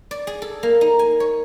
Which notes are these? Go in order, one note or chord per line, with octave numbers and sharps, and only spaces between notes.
D5
G#4
A4
A#3
D#4
G#5
C#5